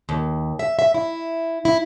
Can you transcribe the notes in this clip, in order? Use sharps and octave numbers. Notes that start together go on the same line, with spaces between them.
D#2
E5
E5
E4
E4